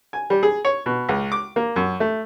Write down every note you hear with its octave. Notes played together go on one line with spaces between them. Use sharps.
G#5
G3
G#4
C#5
B2
C#2
D6
A#3
F#2
A3